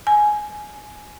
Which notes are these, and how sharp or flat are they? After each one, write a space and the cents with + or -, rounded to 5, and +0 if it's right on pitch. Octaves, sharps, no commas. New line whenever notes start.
G#5 +15